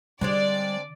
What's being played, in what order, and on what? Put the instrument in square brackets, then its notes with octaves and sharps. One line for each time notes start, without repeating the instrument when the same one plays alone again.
[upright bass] D3 [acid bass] G3 [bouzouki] G#3 C4 D4 [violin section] D5